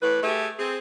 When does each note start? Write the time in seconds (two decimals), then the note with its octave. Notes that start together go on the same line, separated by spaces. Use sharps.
0.01 A2 E3 B4
0.23 A3 G4 G#4 E5
0.59 C4 G#4